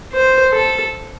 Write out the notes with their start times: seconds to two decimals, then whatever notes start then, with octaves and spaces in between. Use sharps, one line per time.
0.12 C5
0.53 A4